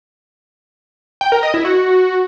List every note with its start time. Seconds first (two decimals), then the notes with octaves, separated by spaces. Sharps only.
1.21 G5
1.32 A#4
1.43 D#5
1.54 E4
1.65 F#4